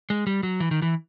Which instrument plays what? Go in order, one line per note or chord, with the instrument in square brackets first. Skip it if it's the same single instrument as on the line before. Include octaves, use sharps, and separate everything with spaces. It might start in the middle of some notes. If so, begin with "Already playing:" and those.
[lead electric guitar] G#3
G3
F#3
E3
D#3
E3